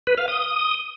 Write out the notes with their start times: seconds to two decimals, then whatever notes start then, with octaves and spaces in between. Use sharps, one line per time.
0.07 B4
0.18 F5
0.28 D#6